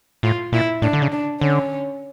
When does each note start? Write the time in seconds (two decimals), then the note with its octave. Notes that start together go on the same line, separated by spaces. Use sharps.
0.23 A2 F4
0.52 A#2 E4
0.82 A2 D4
0.93 D3
1.02 C#3
1.12 D4
1.41 D3 C#4